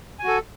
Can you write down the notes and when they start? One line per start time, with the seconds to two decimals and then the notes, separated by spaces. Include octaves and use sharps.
0.19 G#5
0.24 F#4
0.28 A4